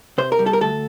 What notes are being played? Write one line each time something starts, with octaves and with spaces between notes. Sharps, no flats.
C3 C5
A#4
G3
A4
A#4
D2 A4